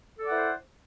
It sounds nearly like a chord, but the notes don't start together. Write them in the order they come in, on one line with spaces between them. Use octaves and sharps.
A4 D5 F#5 E4 C5